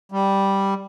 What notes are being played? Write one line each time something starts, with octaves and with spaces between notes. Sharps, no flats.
G3